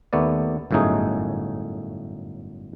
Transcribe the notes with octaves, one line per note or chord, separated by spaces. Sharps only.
D#2 A3 B3 D5
G1 F#2 A2 A3 D#4 G#4